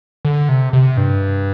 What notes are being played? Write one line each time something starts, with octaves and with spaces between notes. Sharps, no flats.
D3
C3
C3
G2